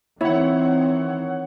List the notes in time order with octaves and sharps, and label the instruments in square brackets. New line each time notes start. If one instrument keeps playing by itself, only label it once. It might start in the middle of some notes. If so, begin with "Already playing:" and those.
[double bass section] D#3 E3 C4 [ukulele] E4 [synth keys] C#5 F#5